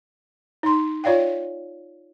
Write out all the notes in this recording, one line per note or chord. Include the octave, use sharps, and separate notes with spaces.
D#4 C6
F4 C#5 D5 F5 G5